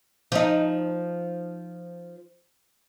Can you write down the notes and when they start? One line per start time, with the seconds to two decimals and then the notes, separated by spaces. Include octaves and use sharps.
0.32 F3 D#4